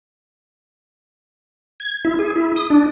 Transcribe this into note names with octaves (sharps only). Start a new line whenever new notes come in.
G#6
E4
G#4
E4
D#6
D4